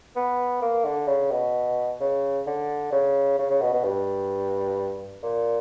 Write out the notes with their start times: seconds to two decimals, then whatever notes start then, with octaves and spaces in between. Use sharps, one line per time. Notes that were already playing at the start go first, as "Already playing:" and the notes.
0.16 B3
0.62 A#3
0.85 D3
1.08 C#3
1.31 B2
2.01 C#3
2.47 D3
2.93 C#3
3.39 C#3
3.50 C#3
3.62 B2
3.73 B2
3.85 G2
5.23 A#2